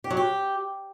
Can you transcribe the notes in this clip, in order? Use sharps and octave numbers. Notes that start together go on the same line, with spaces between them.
G4
F#3
G4